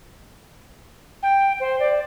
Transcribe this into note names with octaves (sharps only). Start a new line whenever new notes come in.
G5
C5
D5